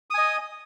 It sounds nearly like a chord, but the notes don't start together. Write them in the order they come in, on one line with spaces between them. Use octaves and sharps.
D#6 G#5 D#5